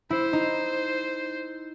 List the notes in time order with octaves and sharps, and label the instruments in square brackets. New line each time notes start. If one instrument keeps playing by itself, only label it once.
[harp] E4 [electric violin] C5
[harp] D#4